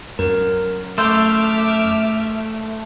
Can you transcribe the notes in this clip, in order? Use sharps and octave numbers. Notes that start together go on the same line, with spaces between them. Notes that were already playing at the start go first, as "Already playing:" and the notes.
F#2 A#4
A3 E5 C6 D6 E6 F6 G6